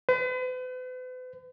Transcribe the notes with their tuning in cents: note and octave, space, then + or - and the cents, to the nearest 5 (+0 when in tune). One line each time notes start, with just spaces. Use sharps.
B4 +45